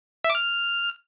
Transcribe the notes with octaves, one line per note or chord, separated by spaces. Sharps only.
E5
D6
F6